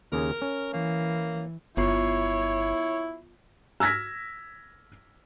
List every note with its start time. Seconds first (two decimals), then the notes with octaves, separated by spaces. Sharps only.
0.12 D#2 C#3 G#4 A#4
0.42 C#4
0.73 E3 A#3
1.77 G1 B3 E4 F4 C#5 C7
3.80 E6 F6 G#6 A#6 B6